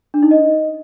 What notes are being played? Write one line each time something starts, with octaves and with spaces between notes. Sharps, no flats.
D4
D#4
D#5